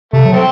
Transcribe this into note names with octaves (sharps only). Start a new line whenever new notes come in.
C3 A3
F#3
A3 C4